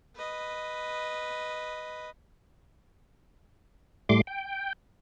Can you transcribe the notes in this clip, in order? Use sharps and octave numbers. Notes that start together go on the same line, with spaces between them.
B4 D#5
A2 G3 A3 C6 D6
G5